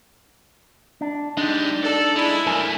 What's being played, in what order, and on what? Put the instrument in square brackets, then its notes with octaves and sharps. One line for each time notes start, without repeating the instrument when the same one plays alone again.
[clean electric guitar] D4
[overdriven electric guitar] G#3 G4 [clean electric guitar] D4 D#4
[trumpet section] A4 [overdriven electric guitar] D5
[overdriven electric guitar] G#3 [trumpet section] E4
[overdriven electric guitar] F#2 A3 [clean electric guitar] A#4 G#5